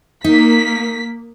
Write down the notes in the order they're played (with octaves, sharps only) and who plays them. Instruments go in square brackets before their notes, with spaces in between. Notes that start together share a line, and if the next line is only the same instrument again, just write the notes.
[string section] A#3 B6 [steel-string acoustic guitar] D#4